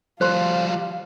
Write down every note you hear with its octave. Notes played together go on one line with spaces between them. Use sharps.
F3 G3 C5 F5 C6